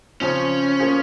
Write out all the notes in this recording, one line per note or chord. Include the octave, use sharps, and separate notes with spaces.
C#3 F3 C4 C#4
F3 A#3 F4 G#4 C5